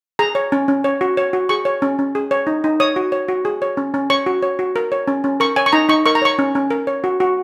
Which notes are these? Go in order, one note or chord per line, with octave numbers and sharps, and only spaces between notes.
G#4 A#5
C#5
C#4
C#4
C#5
F#4
C#5
F#4
G#4 C#6
C#5
C#4
C#4
G#4
C#5
D#4
D#4
C#5 D#6
F#4
C#5
F#4
G#4
C#5
C#4
C#4
C#5 C#6
F#4
C#5
F#4
A#4
C#5
C#4
C#4
A#4 C#6
C#5 G#5
C#6
D#4 A#5
D#4 C#6
A#4 C#6
A#5
C#5 C#6
C#4
C#4
A#4
C#5
F#4
F#4